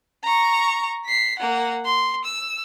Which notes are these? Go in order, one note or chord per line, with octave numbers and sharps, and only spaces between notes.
A#5 C#6
B6 C7
A#3 F#5
C6
E6